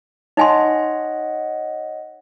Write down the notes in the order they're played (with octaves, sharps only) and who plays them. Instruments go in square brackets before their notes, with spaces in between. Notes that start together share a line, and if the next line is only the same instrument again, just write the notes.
[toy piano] D#4 G#5 C6 [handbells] C#5 D#5 F#5